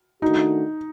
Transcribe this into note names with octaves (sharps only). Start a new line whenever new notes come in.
D#3 A3 D4 D#4 F#4